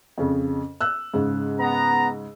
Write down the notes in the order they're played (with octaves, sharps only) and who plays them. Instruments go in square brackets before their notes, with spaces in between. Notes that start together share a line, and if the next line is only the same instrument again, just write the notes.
[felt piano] F2 C#3
E6 F#6
G#2 C#3
[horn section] B3 A#5